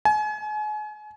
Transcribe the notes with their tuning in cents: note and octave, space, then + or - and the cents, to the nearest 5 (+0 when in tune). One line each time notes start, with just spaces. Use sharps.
G#5 +35